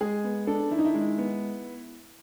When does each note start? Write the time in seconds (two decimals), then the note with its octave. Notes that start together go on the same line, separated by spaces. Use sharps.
0.01 G#3 G#4
0.24 B3
0.47 D4 A4
0.71 D#3 E4
0.79 D#4
0.85 E4
0.95 G#3
1.18 B3